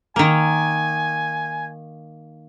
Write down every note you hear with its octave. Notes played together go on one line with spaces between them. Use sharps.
D#3 A#3 G#5